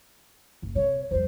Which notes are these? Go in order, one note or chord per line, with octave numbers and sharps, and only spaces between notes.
F#1
C3 C#5
F2 G3 C5